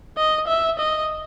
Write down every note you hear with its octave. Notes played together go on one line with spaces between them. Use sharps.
D#5
E5
D#5